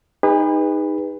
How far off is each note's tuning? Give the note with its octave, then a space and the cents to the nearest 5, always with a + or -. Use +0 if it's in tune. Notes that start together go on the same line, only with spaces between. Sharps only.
D#4 +0 G#4 -45 B4 +0